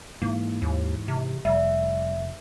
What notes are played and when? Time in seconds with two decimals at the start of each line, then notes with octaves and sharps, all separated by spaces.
0.22 G#2 E3 A#3
0.62 D#2
1.08 C3
1.45 F1 G3 E5